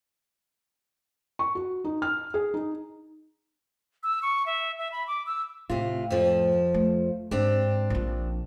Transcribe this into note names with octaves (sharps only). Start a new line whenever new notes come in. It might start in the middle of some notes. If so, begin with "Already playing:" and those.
C#6
F#4
D#4
F6
G#4
D#4
E6
C#6
E5
E5
B5
D6
E6
A2 C3 F4
F2 F3
A3
G#2 C4 D4 G4
A#1 F3